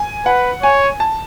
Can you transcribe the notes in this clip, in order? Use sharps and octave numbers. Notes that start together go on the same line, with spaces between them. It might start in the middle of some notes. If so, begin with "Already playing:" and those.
Already playing: G#5
B4 F#5
C#5 G#5
A5